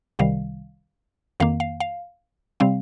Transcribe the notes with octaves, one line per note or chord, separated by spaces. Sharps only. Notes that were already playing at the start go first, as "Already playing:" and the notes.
C2 C3 D#3 G3 F5
F2 D#3 A#3 F5
F5
F5
C3 G3 C4 F5